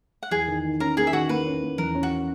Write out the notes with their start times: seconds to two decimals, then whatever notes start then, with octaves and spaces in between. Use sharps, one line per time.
0.23 F#5
0.31 E2 G#4 G#5
0.48 D#3
0.65 D#3
0.80 C#4 A#4 A#5
0.97 A#3 G#4 G#5
1.07 E5
1.13 D#3 F#4 F#5
1.29 A#3 B4
1.45 C#4
1.62 A#3
1.78 E2 A#4
1.95 C#4
2.03 F#4